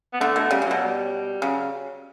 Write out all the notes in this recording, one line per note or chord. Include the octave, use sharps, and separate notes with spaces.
B3
D3 A3
B2 A3
C#3 G3
C#3
B2 F#3
G3
C#3 F#3